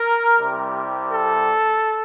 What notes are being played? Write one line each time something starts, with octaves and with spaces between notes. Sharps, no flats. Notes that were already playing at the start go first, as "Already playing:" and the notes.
Already playing: A#4
C2 C3 G3
A4